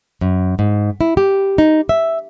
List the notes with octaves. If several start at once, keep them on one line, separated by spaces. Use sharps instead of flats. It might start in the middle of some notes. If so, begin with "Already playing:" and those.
F#2
G#2
E4
G4
D#4
E5